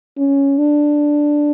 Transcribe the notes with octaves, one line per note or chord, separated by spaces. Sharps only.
C#4
D4